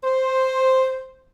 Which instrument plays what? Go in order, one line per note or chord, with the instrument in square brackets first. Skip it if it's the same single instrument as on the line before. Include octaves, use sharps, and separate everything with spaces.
[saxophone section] C5